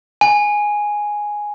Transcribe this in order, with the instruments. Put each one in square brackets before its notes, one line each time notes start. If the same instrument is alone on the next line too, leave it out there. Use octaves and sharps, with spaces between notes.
[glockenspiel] G#5